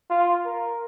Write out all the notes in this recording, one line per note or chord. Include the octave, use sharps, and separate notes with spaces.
F4
A#4